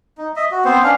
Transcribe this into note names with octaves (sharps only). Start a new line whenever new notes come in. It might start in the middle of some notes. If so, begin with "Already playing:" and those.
D#4
D#5 E5
F#4
B3 C4 C5
C#4 D4 F5